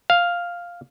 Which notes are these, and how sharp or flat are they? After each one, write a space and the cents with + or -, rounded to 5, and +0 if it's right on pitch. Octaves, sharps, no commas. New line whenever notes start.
F5 +0